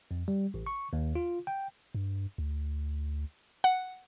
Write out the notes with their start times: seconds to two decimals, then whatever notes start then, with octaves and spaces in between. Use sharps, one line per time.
0.11 F2
0.28 G3
0.54 A1
0.66 C#6
0.93 D#2
1.15 F4
1.47 G5
1.94 G2
2.38 D2
3.64 F#5